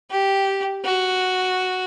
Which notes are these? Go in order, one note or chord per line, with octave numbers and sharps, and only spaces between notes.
G4
F#4